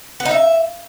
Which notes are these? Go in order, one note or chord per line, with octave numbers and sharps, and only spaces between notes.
B3
D#4
E5